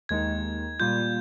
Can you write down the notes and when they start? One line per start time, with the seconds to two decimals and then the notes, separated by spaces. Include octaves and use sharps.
0.09 D#2 D#3 G#3 D#4 G#6
0.80 A#2 G3 A#3 F4 G6